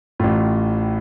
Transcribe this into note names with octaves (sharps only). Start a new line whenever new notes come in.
A1 A2 F4